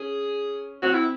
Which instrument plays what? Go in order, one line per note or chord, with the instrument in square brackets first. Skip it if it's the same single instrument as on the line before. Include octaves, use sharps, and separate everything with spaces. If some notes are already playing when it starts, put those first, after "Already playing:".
Already playing: [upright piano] C#4 [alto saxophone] G#4
[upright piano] C4 [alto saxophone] F#4
[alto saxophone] E4